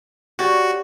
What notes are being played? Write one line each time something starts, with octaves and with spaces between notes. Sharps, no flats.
F#4 G4 C#5 D5